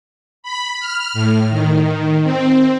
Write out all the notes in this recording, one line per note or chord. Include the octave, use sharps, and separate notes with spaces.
B5
F6
A2
D#3
C4